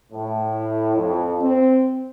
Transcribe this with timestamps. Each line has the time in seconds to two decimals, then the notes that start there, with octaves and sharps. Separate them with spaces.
0.12 A2
0.96 F2
1.41 C4